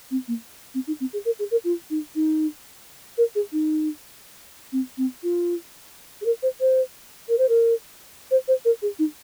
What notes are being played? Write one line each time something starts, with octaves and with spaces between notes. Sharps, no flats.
C4
A#3
C4
D#4
C4
G#4
A#4
G#4
A#4
F4
D#4
D#4
A#4
G#4
D#4
C4
C4
F4
G#4
A#4
C5
C5
A#4
C5
A#4
C5
C5
A#4
G#4
D#4